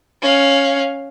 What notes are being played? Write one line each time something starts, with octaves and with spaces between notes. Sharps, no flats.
C#4 F5